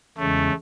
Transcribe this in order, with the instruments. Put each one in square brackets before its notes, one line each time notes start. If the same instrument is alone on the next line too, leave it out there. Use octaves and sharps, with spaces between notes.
[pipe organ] E2 C#3 G#3 C#4 [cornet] A3